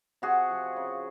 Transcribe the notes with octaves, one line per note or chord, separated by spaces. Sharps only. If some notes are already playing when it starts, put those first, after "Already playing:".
C3 F#4 G#4
F3
C#3